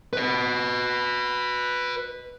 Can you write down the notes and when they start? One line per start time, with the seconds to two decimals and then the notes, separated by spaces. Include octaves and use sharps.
0.13 B4 D#5